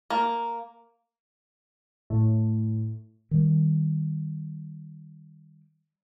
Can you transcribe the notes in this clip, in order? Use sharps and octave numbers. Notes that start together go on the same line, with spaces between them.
A#3
A2
D#3 G3